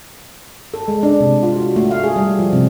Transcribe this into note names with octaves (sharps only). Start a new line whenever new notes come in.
A4
G#3
D4
C3
F4
F#4
A3
F5
G#4
G3
F3
C3